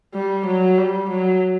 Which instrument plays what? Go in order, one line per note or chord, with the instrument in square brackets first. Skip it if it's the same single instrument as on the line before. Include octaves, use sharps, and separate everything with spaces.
[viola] G3
F#3
G3
F#3